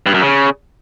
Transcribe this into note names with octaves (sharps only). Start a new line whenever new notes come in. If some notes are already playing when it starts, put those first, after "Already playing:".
G2
F#2
C#3